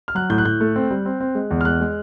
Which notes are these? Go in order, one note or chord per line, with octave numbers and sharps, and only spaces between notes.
F6
F#3 F#6
A2 G6
F#6
A2 G6
A3
C4
G3
C4
C4
G#3
E2
F6
G#3 F#6
G#3